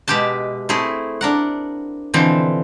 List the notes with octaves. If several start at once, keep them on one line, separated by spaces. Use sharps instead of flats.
B2 G#3 G4 E5 A5
A3 C4 E4 G#4
D4 A#4 F#5
B2 D3 E3 F3 C4